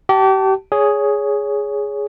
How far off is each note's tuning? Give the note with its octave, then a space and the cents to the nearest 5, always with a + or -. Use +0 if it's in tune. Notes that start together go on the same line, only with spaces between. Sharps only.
G4 -35 A5 +0
G#4 +0 C#5 +20